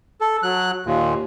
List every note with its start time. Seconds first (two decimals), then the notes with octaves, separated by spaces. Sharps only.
0.21 A4
0.43 F#3 F#6
0.86 D#2 A#2